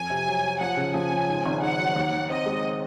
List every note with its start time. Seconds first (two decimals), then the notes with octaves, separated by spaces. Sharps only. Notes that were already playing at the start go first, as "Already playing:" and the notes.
Already playing: F2 G#5
0.10 C3
0.27 F#3
0.44 F#3
0.60 F3 F#5
0.77 C#3
0.94 F3 G#5
1.11 C#3
1.28 G#2
1.46 G#1
1.62 G#2 F#5
1.79 F#3
1.96 D#2
2.12 D#3
2.30 C4 D#5
2.46 G#3